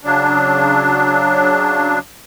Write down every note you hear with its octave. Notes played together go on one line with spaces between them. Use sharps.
C#3 F#3 D4